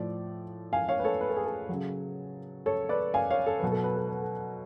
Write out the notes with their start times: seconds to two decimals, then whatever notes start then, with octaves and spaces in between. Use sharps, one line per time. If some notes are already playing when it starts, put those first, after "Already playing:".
Already playing: A2 F3 D5
0.73 F5 G#5
0.89 C#5 F5
0.99 B4
1.04 A4 C#5
1.21 B4
1.29 A4
1.36 G#4
1.46 A4
1.69 C#3 F#3
2.66 A4 C#5
2.89 B4 D5
3.14 F5 G#5
3.31 C#5 F5
3.46 A4
3.59 B2 F#3 B4
3.72 A4
3.84 B4
3.96 A4
4.09 B4
4.21 A4